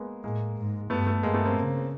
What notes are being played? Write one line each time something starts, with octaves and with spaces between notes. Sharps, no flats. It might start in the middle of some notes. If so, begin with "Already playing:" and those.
Already playing: G#3 A#3 B3
A2 G#3 A#3
G#2
G2 A3 B3
A3
G2 G#3 A#3
A3 B3
A#3 C4
C#3